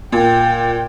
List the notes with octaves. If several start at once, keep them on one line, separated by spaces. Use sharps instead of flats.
A#2 G5